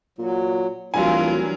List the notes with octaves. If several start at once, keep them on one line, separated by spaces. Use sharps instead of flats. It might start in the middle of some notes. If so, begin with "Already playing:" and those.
A#2 F#3
D1 E3 F#3 G3 D4 F4 A#4 G#5